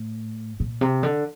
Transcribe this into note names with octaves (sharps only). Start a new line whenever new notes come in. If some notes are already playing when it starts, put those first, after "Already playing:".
Already playing: A2
A#2
C3
D3